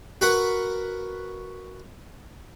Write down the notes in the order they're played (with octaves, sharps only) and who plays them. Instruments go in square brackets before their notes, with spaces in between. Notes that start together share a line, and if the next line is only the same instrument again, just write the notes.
[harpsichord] F#4 A#4 B4 F#5